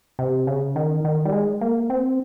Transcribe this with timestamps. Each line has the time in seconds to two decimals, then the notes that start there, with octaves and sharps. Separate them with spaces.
0.19 C3
0.47 C#3
0.76 D#3
1.04 D#3
1.25 G3
1.33 G#3
1.61 A#3
1.90 C4